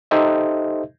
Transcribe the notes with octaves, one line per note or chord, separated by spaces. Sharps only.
D#4 G4 A4 C5 D#5 E5